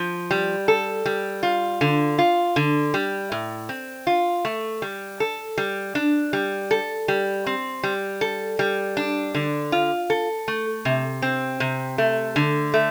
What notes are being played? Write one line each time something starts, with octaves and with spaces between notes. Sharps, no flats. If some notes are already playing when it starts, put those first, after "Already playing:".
Already playing: F3
G3
A4
G3
F4
D3
F4
D3
G3
A2
C4
F4
A3
G3
A4
G3
D4
G3
A4
G3
C4
G3
A4
G3
D4
D3
F4
A4
A3
C3
C4
C3
A3
D3
A3